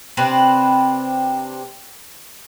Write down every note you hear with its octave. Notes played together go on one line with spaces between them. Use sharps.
C3 C4 D4 B4